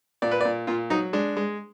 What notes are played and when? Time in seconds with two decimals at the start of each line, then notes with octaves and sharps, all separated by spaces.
0.22 A#2 D5
0.31 B4
0.41 D5
0.45 A#2
0.67 A#2 F4
0.90 F#3 D#4
1.13 G#3 D4
1.37 G#3